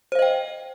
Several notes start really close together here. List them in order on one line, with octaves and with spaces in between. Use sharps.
C5 F5 D#5 G5